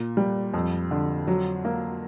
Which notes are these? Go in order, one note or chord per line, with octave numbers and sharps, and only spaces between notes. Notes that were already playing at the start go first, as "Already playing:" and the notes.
Already playing: A#2
G3
F2
D3
F#3
A#3